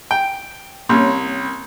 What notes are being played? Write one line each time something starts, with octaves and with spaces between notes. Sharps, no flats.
G5
C2 A#3 C#4 C#5